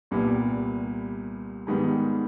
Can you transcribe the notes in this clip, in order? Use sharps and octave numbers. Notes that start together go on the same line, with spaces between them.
C2 A#2 G3 B3
G#2 D#3 G3 B3